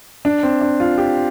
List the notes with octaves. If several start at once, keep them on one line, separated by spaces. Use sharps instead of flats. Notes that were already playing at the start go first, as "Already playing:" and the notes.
D4
C4
D4
F4
G4